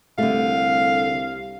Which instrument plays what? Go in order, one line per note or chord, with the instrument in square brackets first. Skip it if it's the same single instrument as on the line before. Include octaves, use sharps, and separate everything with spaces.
[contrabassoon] C2 [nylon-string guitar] D3 A3 [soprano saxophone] F5